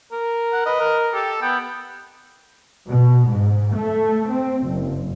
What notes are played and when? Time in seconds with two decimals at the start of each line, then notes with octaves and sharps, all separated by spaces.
0.12 A#4
0.53 F#5
0.66 B4 D#5
0.80 A#4
1.14 G4 A4
1.42 B3 G5
2.89 B2
3.29 G#2
3.75 A3
4.30 C4
4.65 F#1